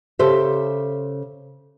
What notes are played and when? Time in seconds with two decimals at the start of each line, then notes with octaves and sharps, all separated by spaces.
0.19 C#3 G4 A4 C5 E5